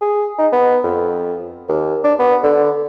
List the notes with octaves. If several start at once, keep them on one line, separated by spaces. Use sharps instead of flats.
G#4
D#4
B3
F2
D#2
D4
B3
D3